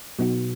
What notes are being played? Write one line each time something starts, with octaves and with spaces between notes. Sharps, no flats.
B2 F#3 B3 D#4 F#4